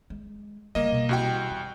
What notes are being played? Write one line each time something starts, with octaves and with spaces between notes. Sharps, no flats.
G#3
C#3 G3 A#3 D#5
B2 E3
C2 F#4 G5
F2